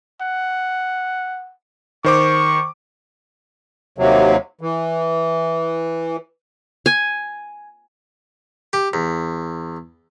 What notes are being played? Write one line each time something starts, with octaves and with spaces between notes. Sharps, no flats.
F#5
D#3 C5 C#6 D6
D#2 C3 F#3
E3
G#5
G4
E2